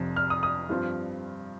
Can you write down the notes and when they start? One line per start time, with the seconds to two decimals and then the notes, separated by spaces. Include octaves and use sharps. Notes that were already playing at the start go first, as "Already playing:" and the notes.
Already playing: F1 F2 C3 F3
0.16 F6
0.30 D#6
0.43 D#6
0.69 G2 F3 C4 F4